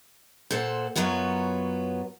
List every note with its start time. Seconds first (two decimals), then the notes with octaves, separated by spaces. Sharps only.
0.51 A#2 A4 C5 F#5
0.96 F#2 F#3 B3 F4 C#5